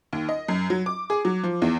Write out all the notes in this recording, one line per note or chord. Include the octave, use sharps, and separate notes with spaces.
D#2
D#5
F#2
F#3
D6
G#4
F#3
F3
E2